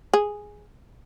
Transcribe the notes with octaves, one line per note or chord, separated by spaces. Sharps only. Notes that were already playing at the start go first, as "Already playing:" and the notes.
G#4